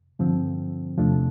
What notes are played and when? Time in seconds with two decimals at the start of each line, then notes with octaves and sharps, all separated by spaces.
0.19 G2 D3 F3 C4
0.98 E2 C3 F3 A3 D4